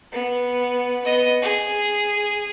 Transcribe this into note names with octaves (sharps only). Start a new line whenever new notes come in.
B3
B3 D#5
G#4